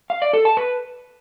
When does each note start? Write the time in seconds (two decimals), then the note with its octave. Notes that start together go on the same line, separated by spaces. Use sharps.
0.10 F5
0.22 D5
0.33 A4
0.45 A5
0.57 B4